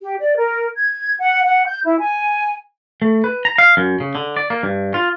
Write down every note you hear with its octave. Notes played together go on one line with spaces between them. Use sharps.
G4
D5
A#4
G#6
F#5
F#5
G6
E4
G#5
A3
B4
A#5
F5
F#2
C#3
D3
D5
A#3
G2
F4